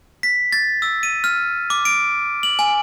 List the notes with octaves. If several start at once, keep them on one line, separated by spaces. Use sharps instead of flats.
B6
A6
E6
D#7
F6
D6
D7
F#7
G#5